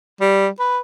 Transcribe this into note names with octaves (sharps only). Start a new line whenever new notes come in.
G3
B4